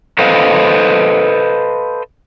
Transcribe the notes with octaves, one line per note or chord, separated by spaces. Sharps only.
A4 B4 C5 D#5 F5